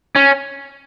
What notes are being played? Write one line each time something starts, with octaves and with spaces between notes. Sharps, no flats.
C#4